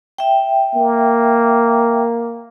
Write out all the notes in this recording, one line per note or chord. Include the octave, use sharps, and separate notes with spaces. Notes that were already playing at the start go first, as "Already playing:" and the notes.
E5 G5
A#3